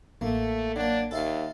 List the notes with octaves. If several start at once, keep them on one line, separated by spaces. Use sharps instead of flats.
A1 A3 A#3
F#3 A#3 D4
D#2 A4 E5 F5